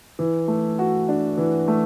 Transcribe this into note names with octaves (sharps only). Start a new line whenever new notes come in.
E3
A3
F#4
D4
E3
A3